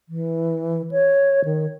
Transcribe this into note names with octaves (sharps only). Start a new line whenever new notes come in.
E3
C#5
D#3